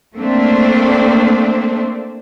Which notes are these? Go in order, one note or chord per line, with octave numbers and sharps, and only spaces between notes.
A3 A#3 C4 D4